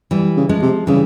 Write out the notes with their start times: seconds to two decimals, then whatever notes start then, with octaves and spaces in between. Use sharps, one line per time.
0.11 E3 G3
0.37 C#3
0.49 F3 G#3
0.62 C3
0.87 C#3 E3 G3